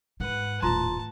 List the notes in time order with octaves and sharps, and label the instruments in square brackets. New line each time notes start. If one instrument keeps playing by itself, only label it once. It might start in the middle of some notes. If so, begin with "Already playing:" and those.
[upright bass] G#2 [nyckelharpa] B4 F#5
[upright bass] D#1 A2 [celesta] F4 A#5 C6 [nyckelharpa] A5